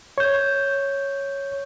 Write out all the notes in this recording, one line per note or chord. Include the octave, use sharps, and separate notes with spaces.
C#5 G6